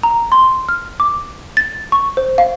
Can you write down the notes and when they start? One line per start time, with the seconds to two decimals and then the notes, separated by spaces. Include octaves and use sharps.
0.03 A#5
0.32 C6
0.69 F6
1.00 D6
1.57 A6
1.92 C#6
2.17 C5
2.38 F5